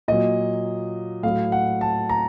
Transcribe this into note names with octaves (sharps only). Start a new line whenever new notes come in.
A#2 F#3 D#5
A2 F#3 F5
F#5
A5
A#5